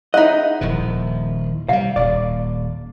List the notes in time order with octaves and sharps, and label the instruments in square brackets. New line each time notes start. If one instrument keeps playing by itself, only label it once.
[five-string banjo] D#4 F#5 [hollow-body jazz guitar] E4 G#4 D#5
[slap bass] D#1 D#3 F3
[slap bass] C3 G3 [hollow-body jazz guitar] F5
[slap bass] D#1 [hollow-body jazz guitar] D5